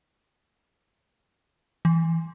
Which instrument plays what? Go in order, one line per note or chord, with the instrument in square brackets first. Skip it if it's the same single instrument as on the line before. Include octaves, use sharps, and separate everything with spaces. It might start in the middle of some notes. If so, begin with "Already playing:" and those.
[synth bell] E3